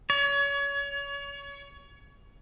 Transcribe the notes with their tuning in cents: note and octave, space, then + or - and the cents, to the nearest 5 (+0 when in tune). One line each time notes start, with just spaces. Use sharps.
C#5 +30